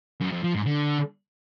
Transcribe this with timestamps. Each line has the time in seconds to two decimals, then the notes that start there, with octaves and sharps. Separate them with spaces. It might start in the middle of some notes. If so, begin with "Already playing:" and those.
0.21 F#2
0.32 F2
0.44 F3
0.55 G#2
0.66 D3